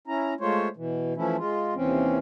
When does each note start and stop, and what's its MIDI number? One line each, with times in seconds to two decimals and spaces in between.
0.07 0.34 61
0.07 0.34 64
0.07 0.34 82
0.40 0.68 56
0.40 0.68 57
0.40 0.68 65
0.40 0.68 72
0.40 0.68 73
0.77 1.13 47
0.77 1.13 52
1.16 1.36 52
1.16 1.36 53
1.16 1.36 57
1.16 1.36 61
1.16 1.36 64
1.38 1.74 56
1.38 1.74 65
1.75 2.18 39
1.75 2.18 48
1.75 2.18 52
1.75 2.18 60
1.75 2.18 61